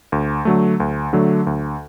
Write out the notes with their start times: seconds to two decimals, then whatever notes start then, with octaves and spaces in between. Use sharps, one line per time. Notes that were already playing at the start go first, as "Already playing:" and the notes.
0.12 D2
0.45 D3 F#3 A3
0.80 D2
1.13 D3 F#3 A3
1.47 D2